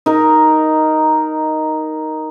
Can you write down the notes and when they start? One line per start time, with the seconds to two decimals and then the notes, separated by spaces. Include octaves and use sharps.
0.06 D#4 A#4